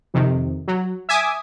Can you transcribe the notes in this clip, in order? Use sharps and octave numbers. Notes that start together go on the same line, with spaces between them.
F2 C3 D#3
F#3
E5 G#5 D6 D#6